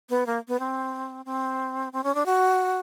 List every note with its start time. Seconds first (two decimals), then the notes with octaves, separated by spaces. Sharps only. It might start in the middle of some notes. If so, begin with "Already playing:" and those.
0.10 B3
0.26 A#3
0.48 B3
0.60 C4
1.25 C4
1.93 C4
2.04 C#4
2.15 D4
2.26 F#4